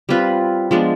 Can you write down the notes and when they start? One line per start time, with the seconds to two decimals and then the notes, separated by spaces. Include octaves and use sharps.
0.09 G3 C4 F4 B4
0.71 F3 G#3 B3 D4